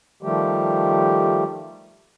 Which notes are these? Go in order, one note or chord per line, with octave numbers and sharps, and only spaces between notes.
D#3 F3 G3 A3 G4